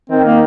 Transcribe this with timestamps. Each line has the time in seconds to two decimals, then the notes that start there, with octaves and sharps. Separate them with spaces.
0.10 D#3 C4
0.25 A#3